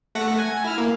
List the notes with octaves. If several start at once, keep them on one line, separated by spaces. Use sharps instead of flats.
A3 F#5 A#6
G#5
E4 F6
A#3